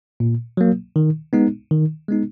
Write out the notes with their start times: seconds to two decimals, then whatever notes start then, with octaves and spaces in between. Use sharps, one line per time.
0.20 A#2
0.57 F#3 A#3
0.96 D#3
1.33 G#3 B3 D#4
1.71 D#3
2.08 G#3 B3 D#4